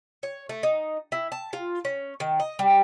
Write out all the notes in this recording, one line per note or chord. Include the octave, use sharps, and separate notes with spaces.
C#5
A3
D#4
E4
A5
F4
C#4
D#3
D#5
G3